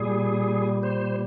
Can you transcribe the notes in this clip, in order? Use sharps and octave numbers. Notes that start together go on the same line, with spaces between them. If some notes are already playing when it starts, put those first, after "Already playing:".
Already playing: A#2 G3 G#4
C5